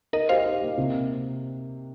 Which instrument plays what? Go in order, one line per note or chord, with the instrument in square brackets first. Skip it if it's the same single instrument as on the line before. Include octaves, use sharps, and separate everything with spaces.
[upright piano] D#4 [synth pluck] A#4 D#5
[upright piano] G4 [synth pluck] C5 F5
[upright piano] D#4
A#3
C3